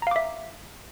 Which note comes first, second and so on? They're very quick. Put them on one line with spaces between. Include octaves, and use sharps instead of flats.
A#5 F5 D6 E5